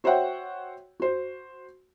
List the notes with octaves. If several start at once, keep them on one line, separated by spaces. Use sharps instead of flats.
F#4 C5 C#5 E5 F#5 G5
F#4 C5